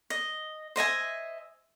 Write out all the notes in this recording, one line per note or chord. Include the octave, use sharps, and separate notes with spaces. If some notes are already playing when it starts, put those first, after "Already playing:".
D#5
C5 D#5 E5 G#5